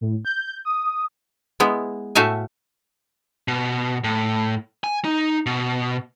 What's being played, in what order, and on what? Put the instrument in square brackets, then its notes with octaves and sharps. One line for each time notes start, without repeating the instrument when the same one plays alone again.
[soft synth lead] A2
G6
D#6
[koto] G#3 B3 E4
A2 A3 F#4 E5 F5 G#5
[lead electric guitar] B2
A2
G#5
D#4
B2